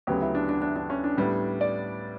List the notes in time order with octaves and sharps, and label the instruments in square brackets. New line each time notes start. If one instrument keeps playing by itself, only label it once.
[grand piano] D2 C#3 F#3 B3 G4
E4
D4
D4
D4
D4
C#4
D4
A2 G3 B3
D5